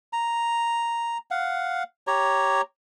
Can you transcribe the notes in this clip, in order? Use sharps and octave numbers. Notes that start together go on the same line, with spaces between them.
A#5
F5 F#5
G4 C#5 A#5